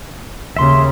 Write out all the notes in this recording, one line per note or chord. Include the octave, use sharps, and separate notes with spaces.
D#2 C#3 E5 C6